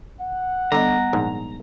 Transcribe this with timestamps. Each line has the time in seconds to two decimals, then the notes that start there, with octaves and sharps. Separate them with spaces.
0.21 F#5
0.72 D3 G3 B3 D#5 A#5
1.13 A#1 G#2